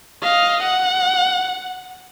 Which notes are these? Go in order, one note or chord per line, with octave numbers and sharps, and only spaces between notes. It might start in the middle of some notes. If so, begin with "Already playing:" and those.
D#5 F5
F#5